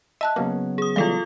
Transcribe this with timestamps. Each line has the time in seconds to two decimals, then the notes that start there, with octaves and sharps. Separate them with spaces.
0.21 D#5 E5 A5 F#6
0.36 C#3 F#3 A#3 B3
0.78 G#4 D#6
0.96 E3 G3 G#3 F4 A4 F5